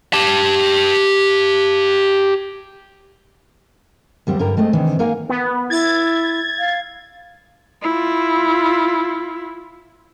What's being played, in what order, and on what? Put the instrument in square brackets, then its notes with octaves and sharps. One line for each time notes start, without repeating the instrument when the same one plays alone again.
[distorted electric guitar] G4 A5
[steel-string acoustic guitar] D#2 G3 C4 F#5
G2 D3 E4 A#4 G5 A#5
G#3 A3 C4 D#5
C3 D#3 E3 D4
A#3 D#4 A#4 F5 F#5 G#5
[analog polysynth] B3
[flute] E4 [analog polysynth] G#6 A6
[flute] F5
[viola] E4 F4